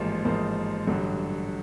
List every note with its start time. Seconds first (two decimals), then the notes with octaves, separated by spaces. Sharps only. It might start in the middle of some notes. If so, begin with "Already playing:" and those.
Already playing: A1 G#2 F3 A#3
0.24 A1 G#2 F3 A#3
0.87 A1 G2 D3 F#3